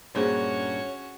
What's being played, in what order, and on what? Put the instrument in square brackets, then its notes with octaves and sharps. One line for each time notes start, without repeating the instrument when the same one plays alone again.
[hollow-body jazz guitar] G2 A#2 [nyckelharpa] C#4 F#4 [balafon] D4 G#4 C5 [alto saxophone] C#5